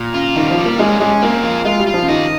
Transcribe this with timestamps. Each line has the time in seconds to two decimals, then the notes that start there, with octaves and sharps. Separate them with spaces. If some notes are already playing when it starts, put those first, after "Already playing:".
Already playing: A#2
0.14 C#3 F4
0.36 D#3 G3
0.51 F3
0.58 G3
0.64 A#3
0.78 G#3 C#4
1.00 G#3 C#4
1.22 A#3 C4
1.43 F4
1.65 G#3 F4
1.80 G3
1.87 F4
1.94 F3
2.02 C#3
2.08 D#3 D#5